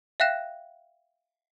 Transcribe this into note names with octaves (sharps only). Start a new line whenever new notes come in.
E5 F5 G5 F#6 A#6 E7